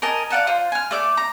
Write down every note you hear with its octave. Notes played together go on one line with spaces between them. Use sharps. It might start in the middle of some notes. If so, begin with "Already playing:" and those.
A#4 D#5 G#5 A5
D5 F5 F#5 A5
F4 C5
G#5 F6
A3 D5 D6
A#5